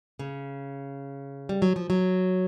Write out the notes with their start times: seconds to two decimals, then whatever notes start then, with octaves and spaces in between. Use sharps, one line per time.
0.19 C#3
1.49 G3
1.62 F#3
1.76 F3
1.90 F#3